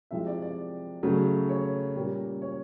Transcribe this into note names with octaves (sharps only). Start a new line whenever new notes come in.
C3 F3 G#3 C4 E4 E5
D5
D5
C#3 F#3 A3
C#5
A#2 G3 A#3 C#4
C#5